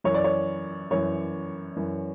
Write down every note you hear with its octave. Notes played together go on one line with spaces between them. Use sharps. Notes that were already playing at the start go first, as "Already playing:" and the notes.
F#2 E3 C#5
D5
C#5
F#2 E3 C#5
F#2 E3